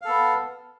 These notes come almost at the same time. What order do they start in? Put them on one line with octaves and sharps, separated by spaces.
F5 A4 B3